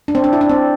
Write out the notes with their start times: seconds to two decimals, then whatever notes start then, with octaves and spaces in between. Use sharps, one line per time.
0.08 D4
0.15 C4
0.24 D4
0.33 E4
0.41 D4
0.49 C4